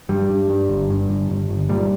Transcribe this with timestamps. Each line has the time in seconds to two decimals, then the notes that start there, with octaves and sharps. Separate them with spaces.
0.09 G2 G3
0.30 G2
0.49 G2
0.69 G1
0.90 G2
1.09 G1
1.30 G1
1.49 G1
1.69 A#2 G3